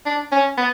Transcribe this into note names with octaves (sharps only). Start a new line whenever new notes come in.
D4
C#4
B3